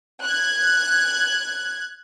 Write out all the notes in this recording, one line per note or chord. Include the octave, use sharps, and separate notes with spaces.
F#6 G#6